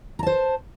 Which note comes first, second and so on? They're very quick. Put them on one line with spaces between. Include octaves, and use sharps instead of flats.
A#5 A5 C5